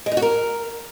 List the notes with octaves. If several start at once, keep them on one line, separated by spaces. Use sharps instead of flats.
G#3
D#4
F#4
A#4